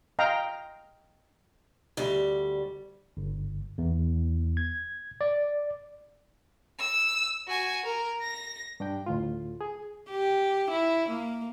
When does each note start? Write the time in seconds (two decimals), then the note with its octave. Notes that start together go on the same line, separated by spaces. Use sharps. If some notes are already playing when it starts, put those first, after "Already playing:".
0.19 D#5 F5 G5 A#5
1.97 D2 G3
3.17 G1
3.78 E2
4.57 G#6
5.21 D5
6.79 E6
7.48 F#4 G#5
7.85 A#4
8.22 A#6
8.80 G2 D4 G5
9.06 D2 A2 F4
9.61 G#4
10.10 G4
10.70 E4
11.09 A#3